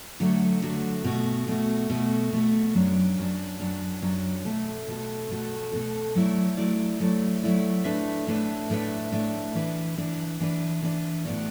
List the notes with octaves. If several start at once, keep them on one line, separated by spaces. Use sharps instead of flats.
D3 F#3 A3 F#4
D3 F#3 A3 F#4
B2 A3 F#4
B2 A3 F#4
B2 A3 F#4
B2 A3 F#4
F#2 F#3 D4
F#2 F#3 D4
F#2 F#3 D4
F#2 F#3 D4
B2 A3 F#4 A4
B2 A3 F#4 A4
B2 A3 F#4 A4
B2 A3 F#4 A4
F#3 A3 E4 D5
F#3 A3 E4 D5
F#3 A3 E4 D5
F#3 A3 E4 D5
A2 A3 D4 B4 E5
A2 A3 D4 B4 E5
A2 A3 D4 B4 E5
A2 A3 D4 B4 E5
E3 D4 B4
E3 D4 B4
E3 D4 B4
E3 D4 B4
A2 F#3 B3 F#4 D5